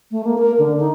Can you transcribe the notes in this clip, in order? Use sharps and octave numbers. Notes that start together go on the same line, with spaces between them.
A3
A#3
A#4
D3
D#4